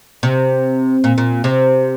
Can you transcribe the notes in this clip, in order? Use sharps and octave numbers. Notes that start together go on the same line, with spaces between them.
C3
A#2
A#2
C3